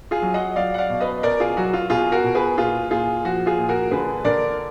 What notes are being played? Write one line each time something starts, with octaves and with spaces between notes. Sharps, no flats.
F4 G#4
F#3
D#5 F#5
F#3 D5 F5
F#5
D5 F5
B2
B4 D#5
B2 A#4 D5
F4 G#4
F#3 F#4
F4
B2 F4 G#4
F#4 A#4
B2
G#4 B4
A#2 F4 G#4
A#2 F4 G#4
F3 F#4
F4 G#4
A#2
F#4 A#4
D3 G#4 B4
D3 A#4 D5